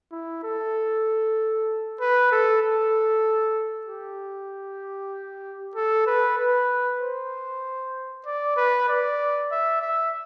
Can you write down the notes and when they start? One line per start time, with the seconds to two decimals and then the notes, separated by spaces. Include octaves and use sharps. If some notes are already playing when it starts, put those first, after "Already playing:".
0.12 E4
0.44 A4
2.00 B4
2.31 A4
2.62 A4
3.87 G4
5.76 A4
6.07 B4
6.38 B4
7.01 C5
8.26 D5
8.57 B4
8.89 D5
9.51 E5
9.82 E5